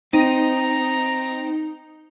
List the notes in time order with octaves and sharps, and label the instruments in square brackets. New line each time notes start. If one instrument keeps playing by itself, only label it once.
[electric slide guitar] C4 [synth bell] D#4 [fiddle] A#5